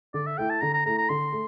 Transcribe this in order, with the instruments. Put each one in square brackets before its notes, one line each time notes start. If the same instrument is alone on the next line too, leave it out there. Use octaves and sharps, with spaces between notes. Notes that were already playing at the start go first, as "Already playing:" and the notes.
[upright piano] D3 [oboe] D5
[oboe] E5
[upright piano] A3 E4 [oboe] G5
[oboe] A5
[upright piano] D3 [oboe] A#5
[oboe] A#5
[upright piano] A3 E4 [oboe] A#5
[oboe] A#5
[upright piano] D3 [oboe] C6
[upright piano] A3